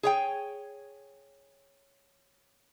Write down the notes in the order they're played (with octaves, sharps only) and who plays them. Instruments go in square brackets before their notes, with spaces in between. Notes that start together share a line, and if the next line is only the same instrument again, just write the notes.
[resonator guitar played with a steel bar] G#4 C#5 G5